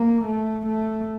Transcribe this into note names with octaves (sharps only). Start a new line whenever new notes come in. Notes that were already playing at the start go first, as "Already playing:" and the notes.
Already playing: A#3
A3
A3